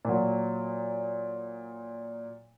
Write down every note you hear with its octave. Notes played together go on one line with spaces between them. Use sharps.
A#2 F#3